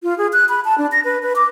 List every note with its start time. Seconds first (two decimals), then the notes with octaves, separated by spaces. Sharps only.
0.03 F4
0.18 G#4
0.33 F#6
0.49 B5
0.65 A5
0.78 D4
0.92 A#6
1.05 B4
1.23 B4
1.36 D6